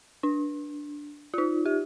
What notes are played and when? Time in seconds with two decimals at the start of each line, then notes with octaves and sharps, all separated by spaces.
0.23 D4
1.34 F4
1.38 D#4
1.66 G4